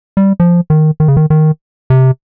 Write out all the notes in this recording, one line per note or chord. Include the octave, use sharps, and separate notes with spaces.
G3
F3
D#3
D#3
C#3
D#3
D#3
C3